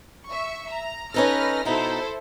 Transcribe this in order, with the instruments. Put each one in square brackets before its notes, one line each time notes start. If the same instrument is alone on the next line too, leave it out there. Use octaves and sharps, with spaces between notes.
[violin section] E5 C#6
A#5
[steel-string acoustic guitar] C#4 D#4 A4 [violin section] B4 F6 A#6
[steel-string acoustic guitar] B2 D#4 [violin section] E4 A4 C5